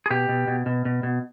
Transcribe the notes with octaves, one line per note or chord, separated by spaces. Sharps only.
G#4
B2 G4
B2
B2
B2
B2
B2